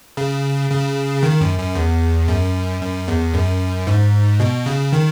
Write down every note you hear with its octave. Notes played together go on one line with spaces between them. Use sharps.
C#3
C#3
D#3
F#2
F#2
E2
F#2
F#2
E2
F#2
G#2
B2
C#3
D#3